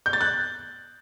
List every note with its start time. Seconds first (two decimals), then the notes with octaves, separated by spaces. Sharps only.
0.06 G6
0.13 A6
0.21 F#6